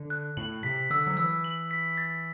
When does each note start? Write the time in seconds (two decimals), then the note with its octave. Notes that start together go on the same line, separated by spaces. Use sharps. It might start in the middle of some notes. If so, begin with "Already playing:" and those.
Already playing: D3
0.10 F#6
0.37 A2 F#7
0.63 C3 B6
0.90 D3 E6
1.07 F#3
1.17 E3 E6
1.44 F#7
1.71 B6
1.97 A6